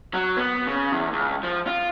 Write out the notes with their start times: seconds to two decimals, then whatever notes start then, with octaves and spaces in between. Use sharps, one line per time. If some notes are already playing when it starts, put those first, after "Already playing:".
0.14 F#3
0.37 B3
0.67 C#3
0.92 E2
1.13 C#2
1.43 F3
1.67 F4